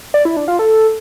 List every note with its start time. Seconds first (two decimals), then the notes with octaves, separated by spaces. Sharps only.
0.14 D5
0.25 E4
0.37 D4
0.48 F4
0.59 A4